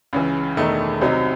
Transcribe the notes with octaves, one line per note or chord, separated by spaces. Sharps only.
C#2 C#3 E3
E1 E2 D#3 A3 D#4
C2 C3 F#3 C4 D#4